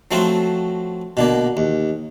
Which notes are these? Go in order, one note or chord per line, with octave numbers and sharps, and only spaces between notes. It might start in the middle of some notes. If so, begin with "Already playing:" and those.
F3 F#3 A3 C4 F4 F#4
B2 D3 A#3
D#2